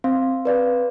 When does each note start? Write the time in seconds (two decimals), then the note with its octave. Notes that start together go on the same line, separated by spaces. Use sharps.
0.04 C4 F5
0.45 B4 D5 F5